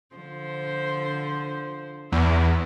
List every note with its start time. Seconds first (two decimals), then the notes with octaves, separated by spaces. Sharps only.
0.15 D3 F3 C5
2.12 E2 E4